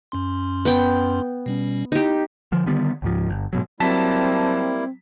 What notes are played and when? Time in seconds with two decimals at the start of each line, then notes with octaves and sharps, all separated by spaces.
0.12 F#2 C#4 C6
0.65 B3 G5
1.46 B2 G3 C#4
1.92 D#4 E4 G4
2.52 D3 F3
2.66 D3 D#3 G3 B3
3.02 C#2 G#2 F3
3.29 G1
3.53 G#2 B2 F#3
3.80 F#3 G3 A#3 C4 E4 A5 B6